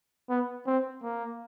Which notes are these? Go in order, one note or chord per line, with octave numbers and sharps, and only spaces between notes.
B3
C4
A#3